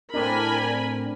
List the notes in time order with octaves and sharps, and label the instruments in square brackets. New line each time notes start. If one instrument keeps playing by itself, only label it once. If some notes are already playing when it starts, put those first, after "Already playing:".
[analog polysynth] A2 C4 D4 [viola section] A#4 G#5 B5